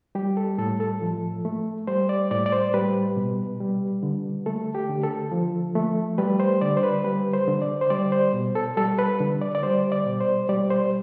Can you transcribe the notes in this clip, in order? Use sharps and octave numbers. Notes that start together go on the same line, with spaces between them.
G3 G4
A4
A2 A4
A4
F3
A3
G3 C5
D5
A2 D5
D5
C5
G3 B4
B2
G3
D3
A3 A4
G4
D3
A4
F3
A3
G3 B4
C5
D3 D5
C5
B4
G3 B4
C5
D3
D5
C5
G3 D5
C5
B2
A4
G3 A4
B4
D3
D5
D5
G3 C5
D5
B2
C5
G3 D5
C5